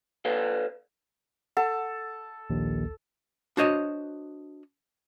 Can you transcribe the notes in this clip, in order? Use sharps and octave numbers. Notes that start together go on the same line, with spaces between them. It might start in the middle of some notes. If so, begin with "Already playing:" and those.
A4 B4 D5 F5
A4 F#5
A#1 D#2
D4 F#4 C5 C#5 D#5